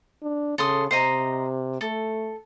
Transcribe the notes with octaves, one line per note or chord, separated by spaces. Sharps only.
D4
C#3 A4 C6 D#6
C3 C5 D#5 A#5
A3 A4